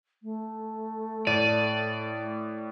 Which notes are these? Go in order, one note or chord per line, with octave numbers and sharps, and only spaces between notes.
A3
A2 D5 D#7